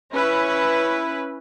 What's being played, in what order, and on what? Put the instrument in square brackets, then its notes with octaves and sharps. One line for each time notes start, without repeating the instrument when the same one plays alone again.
[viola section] C#4 E4 B4